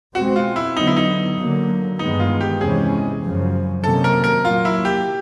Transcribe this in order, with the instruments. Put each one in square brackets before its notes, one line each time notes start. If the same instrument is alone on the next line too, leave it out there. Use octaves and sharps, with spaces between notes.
[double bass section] B2 G#3 C4 [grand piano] F#4
[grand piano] F4
E4
[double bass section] D3 F#3 B3 [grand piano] D#4
[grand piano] E4
D#4
[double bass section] D3 F#3 A#3
[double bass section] G2 D#3 G#3 B3 [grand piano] D#4
[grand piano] F4
G4
[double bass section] E2 C3 E3 G#3 C#4 [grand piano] G#4
[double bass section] F#2 C#3 F3
[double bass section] C3 D#3 F#3 A#3 C#4 [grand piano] A4
[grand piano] A#4
A#4
[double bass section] A#2 F#3 A#3 [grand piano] F4
[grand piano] E4
G4